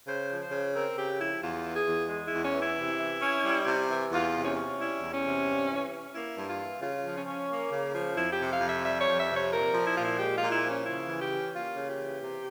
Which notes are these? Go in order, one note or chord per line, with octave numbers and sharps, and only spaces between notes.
C#3 C5
F3
C5
C#3
C4 A#4
C#3 G4
F3 E4
E2 F4
E3
G#4
E2
G#3
E4
E2
C#4
E3
E4
C3
E3
C#4
G3
C3
E3
E2 F4
C3
C#4
C#4
G3 E4
E2
C#4
C3
G2
E3
C#4
A#3 E4
G2
F4
E3
C#3 F4
F3
C#4
C#4
A#3
C#3
F3
F2 E4
G4
C3
F5
F2
E5
G3 E5
C#5
F2
E5
C3
C#5
A#2 A#4
F3
E4
A#2 F4
E4
G#3 G4
A#2 F4
E4
F3
C#4
C#3 E4
E3
G4
C#4
A#3 F4
C#3
G4
E3
C3